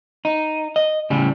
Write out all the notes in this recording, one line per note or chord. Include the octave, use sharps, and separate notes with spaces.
D#4
D#5
A2 C#3 G3